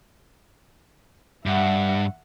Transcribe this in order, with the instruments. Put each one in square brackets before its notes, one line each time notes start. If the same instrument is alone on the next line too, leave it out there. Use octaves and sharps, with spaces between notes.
[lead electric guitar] G2 [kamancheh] E5 F#5